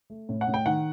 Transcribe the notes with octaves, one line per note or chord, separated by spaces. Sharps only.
A3
A2
F#5
A2
G5
D#3 F#5